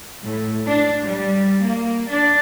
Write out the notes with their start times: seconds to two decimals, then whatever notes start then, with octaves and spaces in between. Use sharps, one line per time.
0.24 A2
0.67 D4
1.02 G3
1.61 A#3
2.08 D4